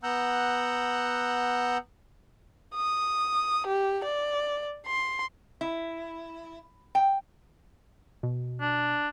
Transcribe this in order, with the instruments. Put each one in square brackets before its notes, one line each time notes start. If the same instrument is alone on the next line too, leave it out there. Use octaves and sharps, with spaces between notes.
[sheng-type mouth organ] B3 F#5 A#5 E6 F#6 G6
[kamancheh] D#6
G4
D5
C6
[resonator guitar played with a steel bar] E4
G5
[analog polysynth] B2
[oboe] D4